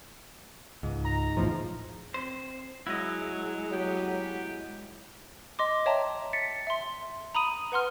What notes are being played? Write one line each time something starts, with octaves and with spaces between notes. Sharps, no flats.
C#2 G#2
A#5
A#1 E2 A2 F3
C4 C5
F#3 G#3 E4 D#5
F#3 B3 G4
D#5 C6 D6
C#5 E5 G5 A5 A#5
A6 B6 C#7
E5 C6
A#5 B5 D#6 D#7
B4 F#5 C6 F6